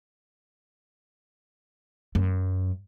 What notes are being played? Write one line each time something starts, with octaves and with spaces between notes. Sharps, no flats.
F#2